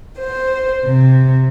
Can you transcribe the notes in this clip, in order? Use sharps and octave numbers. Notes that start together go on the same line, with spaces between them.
C5
C3